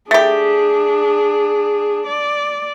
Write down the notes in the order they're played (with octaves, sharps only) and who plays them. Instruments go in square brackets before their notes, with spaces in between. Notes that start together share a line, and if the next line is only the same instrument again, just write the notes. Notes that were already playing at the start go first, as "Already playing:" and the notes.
[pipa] A3 G4 [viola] D4 G#4
[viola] D5